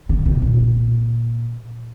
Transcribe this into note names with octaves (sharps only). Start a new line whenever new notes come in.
D3
C3
A#2